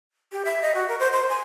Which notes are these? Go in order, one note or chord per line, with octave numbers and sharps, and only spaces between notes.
G4
E5
D#5
F#4
A#4
C5
C6
G#5